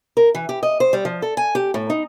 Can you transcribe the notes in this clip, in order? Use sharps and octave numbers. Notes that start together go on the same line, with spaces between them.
A#4
E3
G4
D#5
C5
G3
F3
A4
G#5
G4
A2
D#4